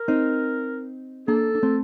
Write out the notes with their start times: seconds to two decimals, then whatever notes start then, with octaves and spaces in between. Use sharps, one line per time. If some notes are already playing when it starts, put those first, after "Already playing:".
Already playing: A#4
0.08 C4 D#4
1.28 A#3 D4 A4
1.55 D4
1.63 A3 C4